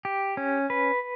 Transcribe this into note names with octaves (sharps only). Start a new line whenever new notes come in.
G4
C#4
B4